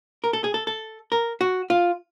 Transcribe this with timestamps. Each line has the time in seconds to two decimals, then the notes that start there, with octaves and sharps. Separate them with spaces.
0.24 A#4
0.33 A4
0.44 G#4
0.54 A4
0.67 A4
1.12 A#4
1.41 F#4
1.70 F4